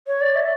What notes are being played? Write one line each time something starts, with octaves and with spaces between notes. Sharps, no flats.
C#5
D5
E5